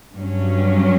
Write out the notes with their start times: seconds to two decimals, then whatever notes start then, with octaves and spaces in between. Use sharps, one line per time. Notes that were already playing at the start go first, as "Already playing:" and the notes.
0.14 G2 F#3 C#4